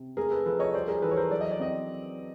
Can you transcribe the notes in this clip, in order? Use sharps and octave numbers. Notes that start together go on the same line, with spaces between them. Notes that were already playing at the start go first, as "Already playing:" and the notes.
Already playing: C3
A3 G#4 A#4
A4 B4
F3 A4 B4
C#5 D#5
G3 C5 D5
G#4 A#4
E3 A4 B4
C#5
A#4 C5
F#3 D5
D#5
D5
C4 D#5